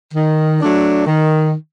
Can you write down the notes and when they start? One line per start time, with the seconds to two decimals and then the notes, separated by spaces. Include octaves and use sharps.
0.14 D#3
0.61 F#3 A3 D4
1.07 D#3